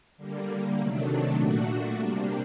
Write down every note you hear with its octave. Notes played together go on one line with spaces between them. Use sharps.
D3 G3 A#3
C3 D#3 F#3 A3 D4
A#2 A3 D4 F#4
C3 G3 A#3 D4